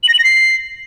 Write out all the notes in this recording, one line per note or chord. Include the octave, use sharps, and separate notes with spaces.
F#7
A#6
F#7
A#6
C7